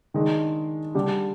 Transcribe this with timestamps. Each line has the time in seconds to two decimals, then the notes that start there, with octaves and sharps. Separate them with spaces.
0.14 D#3 G#3 D4
0.95 D3 G3 D4 G4